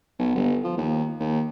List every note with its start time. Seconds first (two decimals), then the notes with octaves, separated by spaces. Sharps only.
0.19 B1
0.35 G1
0.64 F3
0.78 D#2
1.20 D#2